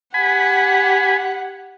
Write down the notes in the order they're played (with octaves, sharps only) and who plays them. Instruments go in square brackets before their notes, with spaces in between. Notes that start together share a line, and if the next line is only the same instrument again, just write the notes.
[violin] G4 F#5 [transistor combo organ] G#5 B5